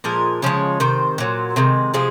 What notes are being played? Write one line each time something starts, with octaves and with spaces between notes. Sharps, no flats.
A#2 F3 G#3 A#4
C#3 F3 G#3 C#5
C3 D#3 C5
A#2 F#3
C3 D#3 G#3
C3 F3 G#3 G#4